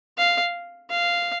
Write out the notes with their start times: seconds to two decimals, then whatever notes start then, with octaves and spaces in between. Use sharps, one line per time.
0.18 F5
0.90 F5